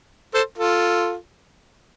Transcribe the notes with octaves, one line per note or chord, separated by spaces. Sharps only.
A4 C5
F4 A4